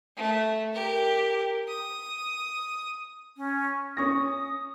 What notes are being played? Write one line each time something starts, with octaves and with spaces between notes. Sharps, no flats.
A3
G4 A#4
D#6
C#4
C#4 C#6 D#6 A#6